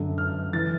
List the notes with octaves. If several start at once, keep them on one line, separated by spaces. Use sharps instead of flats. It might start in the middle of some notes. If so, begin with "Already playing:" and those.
Already playing: F#2 D3
F6
E3 A6